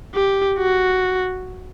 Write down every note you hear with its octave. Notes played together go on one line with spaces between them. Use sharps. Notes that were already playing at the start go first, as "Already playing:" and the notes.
G4
F#4